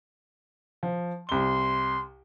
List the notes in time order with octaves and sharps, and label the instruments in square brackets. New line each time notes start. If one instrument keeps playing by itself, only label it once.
[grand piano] F3
[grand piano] C2 G7 [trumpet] C6